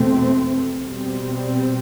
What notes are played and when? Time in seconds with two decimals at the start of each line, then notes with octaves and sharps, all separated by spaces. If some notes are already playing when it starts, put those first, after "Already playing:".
Already playing: E2 B2 A3 C4
0.86 B2 G3 C4